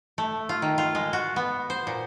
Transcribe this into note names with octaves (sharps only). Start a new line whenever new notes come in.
A3
F4
D#3
F4
G#3
F#4
B3
C5
A#2